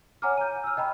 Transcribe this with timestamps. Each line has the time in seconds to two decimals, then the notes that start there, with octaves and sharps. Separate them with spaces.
0.22 C#5 F#5 G#5 A#5 D6 F6
0.37 G6 D#7
0.64 E6 F6
0.77 D#5 G5 A#5 B5